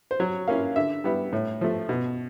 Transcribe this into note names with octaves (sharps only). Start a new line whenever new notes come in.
C5
F#3 C#5
A#3 C#4 E4 F5
D3 E5
G3 B3 E4
A2
F3 A3
B2